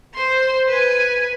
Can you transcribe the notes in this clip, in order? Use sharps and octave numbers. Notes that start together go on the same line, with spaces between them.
C5 C6
B4 G#5